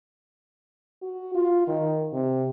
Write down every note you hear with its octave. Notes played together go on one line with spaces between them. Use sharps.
F#4
F4
D#3
C3